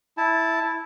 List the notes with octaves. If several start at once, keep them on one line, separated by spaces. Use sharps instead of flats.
E4 A5